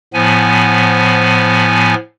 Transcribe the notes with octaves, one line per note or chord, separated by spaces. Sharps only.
A2 F3 B3 G#5